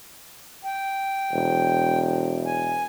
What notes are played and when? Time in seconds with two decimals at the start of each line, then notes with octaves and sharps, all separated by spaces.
0.65 G5
1.33 E1
2.46 G#5